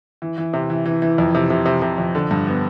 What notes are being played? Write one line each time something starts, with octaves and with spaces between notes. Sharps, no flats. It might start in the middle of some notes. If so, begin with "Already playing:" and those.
E3
E3
C3
E3
E3
E3
F2
C3
C3
C3
C3
F2
D3
G2
B3